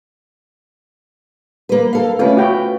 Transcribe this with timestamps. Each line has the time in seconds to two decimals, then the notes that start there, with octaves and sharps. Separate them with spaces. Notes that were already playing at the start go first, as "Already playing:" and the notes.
1.69 A#3 B4
1.93 A4 F5
2.19 A3 C#4 F4 B4
2.37 F#4 G5